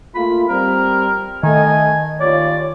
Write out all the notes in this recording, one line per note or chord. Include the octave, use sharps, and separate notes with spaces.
A3 A#3 F4 B5
G3 C4 A#4
D#3 A3 D#5 G#5
D#2 F4 C#5 D5